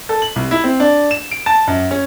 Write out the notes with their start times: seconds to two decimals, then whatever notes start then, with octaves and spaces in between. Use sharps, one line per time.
0.09 A4
0.22 F#7
0.36 C2
0.51 E4
0.64 C4
0.80 D4
1.11 E7
1.31 D7
1.46 A5
1.67 F#2
1.91 C#4